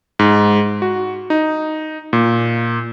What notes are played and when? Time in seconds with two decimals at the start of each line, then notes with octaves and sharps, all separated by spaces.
0.19 G#2
0.82 F#4
1.30 D#4
2.13 A#2